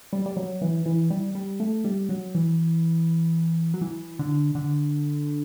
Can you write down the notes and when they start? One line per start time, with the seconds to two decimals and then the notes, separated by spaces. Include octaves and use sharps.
0.13 G3
0.26 G3
0.37 F#3
0.61 E3
0.86 E3
1.10 G3
1.35 G3
1.60 A3
1.84 G3
2.09 F#3
2.35 E3
3.74 F#3
3.81 E3
4.19 D3
4.55 D3